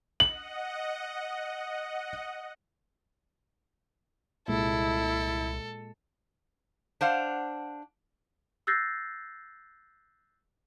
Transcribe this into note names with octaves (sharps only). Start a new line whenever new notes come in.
D#5 F#5 F#7
C2 A#2 G#3 E4 A4
D4 C5 F5 F#5
E6 F#6 G6 A6 A#6 C7